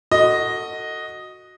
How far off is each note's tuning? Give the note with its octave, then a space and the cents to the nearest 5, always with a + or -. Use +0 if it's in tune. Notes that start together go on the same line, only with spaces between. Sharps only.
F#4 -5 A4 +25 D#5 +0